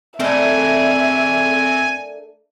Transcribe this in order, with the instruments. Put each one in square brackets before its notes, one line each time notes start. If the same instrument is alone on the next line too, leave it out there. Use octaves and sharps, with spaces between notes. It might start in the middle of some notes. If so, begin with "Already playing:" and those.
[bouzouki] A3 D4 A#4 [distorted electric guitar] C4 D#5 [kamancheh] E5 [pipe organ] G#5